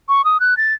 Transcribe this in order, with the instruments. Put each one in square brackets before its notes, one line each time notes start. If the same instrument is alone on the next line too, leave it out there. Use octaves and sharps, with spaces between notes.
[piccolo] C#6
D#6
F#6
A6